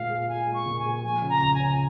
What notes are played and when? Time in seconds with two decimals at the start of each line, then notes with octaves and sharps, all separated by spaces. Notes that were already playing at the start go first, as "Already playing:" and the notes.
Already playing: A#2 G#3 F4 F5
0.10 G#4
0.29 F4 G#5
0.47 G#3
0.54 C#6
0.66 A#2
0.79 G#5
0.85 G#4
1.03 F3 G#5
1.22 C#3
1.29 A#5
1.41 C#2
1.54 G#5
1.60 C#4